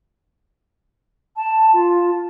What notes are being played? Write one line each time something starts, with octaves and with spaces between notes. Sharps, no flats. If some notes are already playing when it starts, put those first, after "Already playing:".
A5
F4